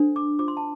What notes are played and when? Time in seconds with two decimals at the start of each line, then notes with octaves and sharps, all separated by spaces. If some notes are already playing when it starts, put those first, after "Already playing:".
Already playing: D4 A4 C5
0.16 D6
0.39 F4 C5 D6
0.48 C6
0.57 A5